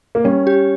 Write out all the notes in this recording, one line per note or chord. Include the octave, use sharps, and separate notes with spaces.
A#3
G3 C#4
G4